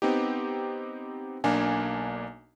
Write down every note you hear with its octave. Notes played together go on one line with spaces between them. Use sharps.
B3 C4 D#4 G4
B1 A#3 D4 G#5